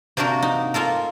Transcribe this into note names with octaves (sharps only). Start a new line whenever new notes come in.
C3 A#3 D4 F#4 A#4
D#4
A#3 F4 A4 A#4